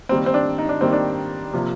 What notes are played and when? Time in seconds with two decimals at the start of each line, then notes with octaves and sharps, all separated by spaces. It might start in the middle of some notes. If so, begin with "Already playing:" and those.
0.09 D#3 G3 A#3 C4
0.26 C4
0.34 D4
0.58 D#4
0.69 D4
0.81 D#3 G3 A#3 C4
0.93 D4
1.53 C3 F3 A#3